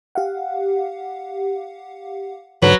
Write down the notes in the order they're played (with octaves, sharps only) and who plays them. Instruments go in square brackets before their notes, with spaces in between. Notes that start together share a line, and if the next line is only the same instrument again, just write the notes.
[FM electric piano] G4 F5 F#5
[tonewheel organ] G#2 D3 [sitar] F#3 [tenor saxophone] B4